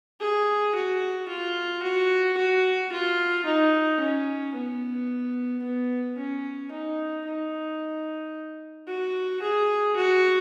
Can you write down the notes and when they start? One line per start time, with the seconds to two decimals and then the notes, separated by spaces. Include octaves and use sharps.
0.20 G#4
0.75 F#4
1.29 F4
1.83 F#4
2.38 F#4
2.92 F4
3.45 D#4
4.00 C#4
4.54 B3
5.63 B3
6.18 C#4
6.71 D#4
7.26 D#4
8.88 F#4
9.42 G#4
9.96 F#4